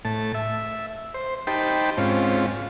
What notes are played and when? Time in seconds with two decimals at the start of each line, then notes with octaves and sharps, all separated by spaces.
0.05 A2 A5
0.35 E5
1.14 C5
1.47 D#4 G4 C5 G5 A5 B5
1.98 G#2 C4 C#4 F4